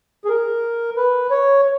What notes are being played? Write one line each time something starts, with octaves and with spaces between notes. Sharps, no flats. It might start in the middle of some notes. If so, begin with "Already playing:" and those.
G#4
A#4
B4
C#5